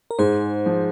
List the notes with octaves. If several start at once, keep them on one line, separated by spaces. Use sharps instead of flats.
A#4
G#2 G#4 C5
F3